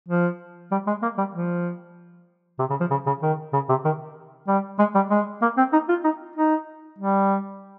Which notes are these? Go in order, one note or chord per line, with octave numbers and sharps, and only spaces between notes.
F3
G3
G#3
A#3
G3
F3
C3
C#3
F3
C#3
C#3
D#3
C#3
C3
D#3
G3
G#3
G3
G#3
A#3
C4
D#4
F4
D#4
D#4
G3